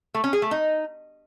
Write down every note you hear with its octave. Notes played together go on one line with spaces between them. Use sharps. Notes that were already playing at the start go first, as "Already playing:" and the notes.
A3
C#4
G#4
A3
D#4